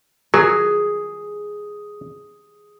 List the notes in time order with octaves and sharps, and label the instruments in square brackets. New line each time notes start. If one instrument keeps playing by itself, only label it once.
[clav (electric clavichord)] F#3 [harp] G#4